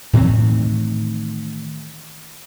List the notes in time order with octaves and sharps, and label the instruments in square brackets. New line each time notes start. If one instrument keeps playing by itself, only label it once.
[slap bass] A2 D#3 E3 C4